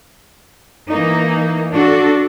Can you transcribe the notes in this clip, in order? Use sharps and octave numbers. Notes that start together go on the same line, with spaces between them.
E3 A#3 D#4
D4 F#4 A4